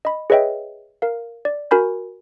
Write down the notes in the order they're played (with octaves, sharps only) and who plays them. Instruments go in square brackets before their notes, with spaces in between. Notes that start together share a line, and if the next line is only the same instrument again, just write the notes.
[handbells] D#5 B5
G#4 B4 C#5 D#5 E5 G5
A#4 F5
D5
F#4 A#4 G#5 B5 G6